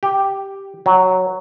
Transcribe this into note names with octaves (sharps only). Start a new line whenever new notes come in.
G4
F#3